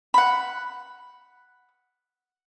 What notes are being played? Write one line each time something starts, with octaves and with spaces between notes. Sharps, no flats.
F#5 B5